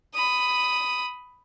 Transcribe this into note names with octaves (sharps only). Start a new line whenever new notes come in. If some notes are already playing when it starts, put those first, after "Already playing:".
B5 D#6